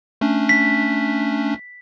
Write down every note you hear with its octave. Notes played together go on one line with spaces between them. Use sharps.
A3 C#4 D4
B6